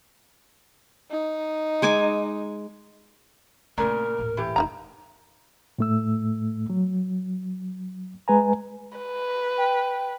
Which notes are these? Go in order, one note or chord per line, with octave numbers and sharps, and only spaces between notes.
D#4
G#3 G#5 D6
A#2 C#3 A3 C4 A#4
D#1 A1
E3 G4
F1 D#4 E4 A#5
A2 A3 E6
F#3
G#3 B4 G#5 A#5
B4
G5